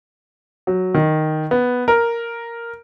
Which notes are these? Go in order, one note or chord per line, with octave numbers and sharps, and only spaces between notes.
F#3
D#3
B3
A#4